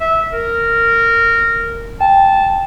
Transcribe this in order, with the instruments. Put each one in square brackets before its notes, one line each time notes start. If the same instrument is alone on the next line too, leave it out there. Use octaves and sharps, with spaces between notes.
[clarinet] E5
A#4
[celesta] G5 [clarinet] A5